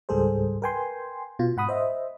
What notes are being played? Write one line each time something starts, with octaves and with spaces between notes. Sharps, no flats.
C#2 G#2 G3 G#4 A4 C5
A#4 B4 G5 G#5 C6
B2 F4
G#2 F#5 B5 D#6
C5 D#5 E5